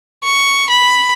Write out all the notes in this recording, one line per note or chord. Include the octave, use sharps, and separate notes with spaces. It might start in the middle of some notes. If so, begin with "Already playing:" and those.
C#6
B5